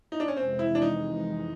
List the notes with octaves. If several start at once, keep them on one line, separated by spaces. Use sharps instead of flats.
D#4
D4
C#4
F2 C3 E3 G#3 C4
E4
D4
D#4